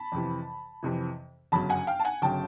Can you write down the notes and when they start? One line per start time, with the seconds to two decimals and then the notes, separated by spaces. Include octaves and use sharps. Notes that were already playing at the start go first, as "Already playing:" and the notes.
Already playing: A5 B5
0.12 F2 C3 E3
0.83 F2 C3 E3
1.52 G1 F#2 C#3 F#3 A5 B5
1.70 F#5 G#5
1.87 F5 G5
2.00 A5
2.05 F#5 G#5
2.22 G1 C#3 F#3 G5 A5